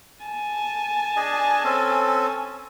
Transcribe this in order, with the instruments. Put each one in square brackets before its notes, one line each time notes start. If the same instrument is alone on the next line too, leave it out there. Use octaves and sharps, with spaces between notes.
[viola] G#5 A5
[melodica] D4 G#4 D#5
C4 C#4 A4